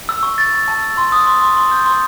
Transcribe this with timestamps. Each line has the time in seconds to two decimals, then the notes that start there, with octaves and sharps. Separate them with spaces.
0.09 E6
0.23 C#6
0.38 A6
0.53 C#6
0.68 A5
0.83 E6
0.97 C6
1.12 D#6
1.27 C6
1.42 C6
1.57 C6
1.71 G6
1.86 C6